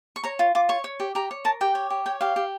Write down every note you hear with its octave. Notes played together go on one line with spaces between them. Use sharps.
C#6
C#5 A#5
F4
F4 D6
C#5 C#6
C#5
G4
G4 A#5
C#5
A#4 A5
G4 G5
C#5
G4
C#5 G5
G4 F5
G4